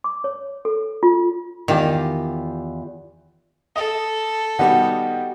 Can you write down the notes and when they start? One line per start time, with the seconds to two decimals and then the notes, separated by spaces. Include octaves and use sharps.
0.04 D6
0.24 C#5
0.65 A4
1.03 F4
1.68 E2 D#3 F4 G4
3.76 A4 D#5
4.59 D#3 G3 B3 F#4 G4 D#5 F#5